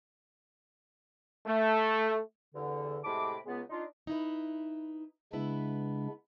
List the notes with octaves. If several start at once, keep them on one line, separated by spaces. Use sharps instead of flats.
A3
E2 G2 D3
A2 C3 G#3 A5 B5 D6
C#2 G#3 B3
D4 D#4 F4
D#4 E4 B4
C#3 G#3 B3 D4 E4 B4